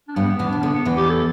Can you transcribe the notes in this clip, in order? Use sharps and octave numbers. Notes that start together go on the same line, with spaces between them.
D4
G2 G3 B3
B3
E2 E3
D4
B2
D3 B3
B3
E2 E3
G4
A4